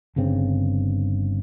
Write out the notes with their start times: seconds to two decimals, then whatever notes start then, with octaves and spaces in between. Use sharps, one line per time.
0.16 G1 G2 C#3 C4